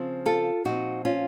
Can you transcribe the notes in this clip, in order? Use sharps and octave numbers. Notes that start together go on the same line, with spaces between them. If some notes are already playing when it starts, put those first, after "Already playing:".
Already playing: C#3 F3 C4
F4 A4
A#2 F3 C4 D#4 F#4
C#4 F4